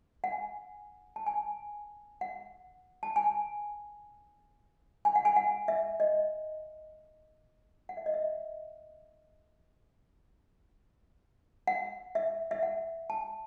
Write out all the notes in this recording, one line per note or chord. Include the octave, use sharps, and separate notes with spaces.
F#5
G#5
A5
G#5
F#5
A5
G#5
G#5
F#5
G#5
F#5
E5
D#5
F#5
E5
D#5
E5
F#5
E5
E5
F#5
A5